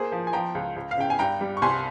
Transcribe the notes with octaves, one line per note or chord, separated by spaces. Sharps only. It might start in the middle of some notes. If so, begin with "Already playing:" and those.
Already playing: A#3 G#4 C5
F3
G#5
F3 G5 A#5
C#2
C#2
F5
C#3 G5
G#5
G2 G5 A#5
G3
C#6
C2 G#5 C6